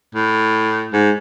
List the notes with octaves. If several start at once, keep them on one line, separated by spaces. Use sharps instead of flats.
A2
G#2